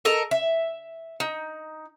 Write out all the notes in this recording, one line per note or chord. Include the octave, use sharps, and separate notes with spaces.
A4 A#4 D#5 A#5
E5
D#4